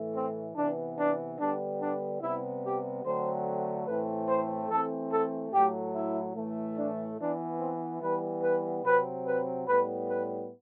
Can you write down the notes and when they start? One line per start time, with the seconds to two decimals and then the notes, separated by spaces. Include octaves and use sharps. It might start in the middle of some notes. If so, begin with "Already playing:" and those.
Already playing: A2 E3 A3
0.14 C4
0.55 C3 E3 B3 D4
0.98 D4
1.38 D3 G3 B3 D4
1.80 D4
2.21 C3 G3 B3 E4
2.63 G4
3.04 D3 F#3 A3 C4 C5
3.86 A2 E3 A3 C4 B4
4.28 C5
4.69 E3 A3 C4 A4
5.10 A4
5.52 A2 F#3 A3 G4
5.94 E4
6.35 A2 E3 A3
6.76 D4
7.18 E3 B3 D4
7.59 C4
8.01 E3 G3 B3 B4
8.42 B4
8.83 C3 F#3 C4 B4
9.26 B4
9.67 A2 G3 B3 B4
10.08 B4